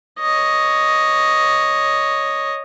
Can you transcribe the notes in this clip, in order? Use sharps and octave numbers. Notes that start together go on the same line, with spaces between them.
C#5 D#5